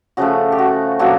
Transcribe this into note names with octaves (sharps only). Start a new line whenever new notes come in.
C#3 F3 A3 F#4
G4
F#4
B2 F#3 A#3 D4 F#4